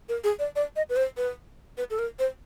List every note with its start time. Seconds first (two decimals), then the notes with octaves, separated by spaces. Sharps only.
0.09 A#4
0.24 G#4
0.39 D5
0.56 D5
0.76 D#5
0.89 B4
0.96 C5
1.17 B4
1.78 B4
1.90 A4
1.99 A#4
2.19 C5